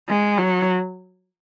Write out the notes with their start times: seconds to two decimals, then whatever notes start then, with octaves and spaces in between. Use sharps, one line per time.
0.09 G#3
0.38 F#3